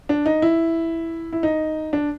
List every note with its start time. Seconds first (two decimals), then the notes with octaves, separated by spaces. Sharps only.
0.09 D4
0.26 D#4
0.42 E4
1.33 E4
1.43 D#4
1.93 D4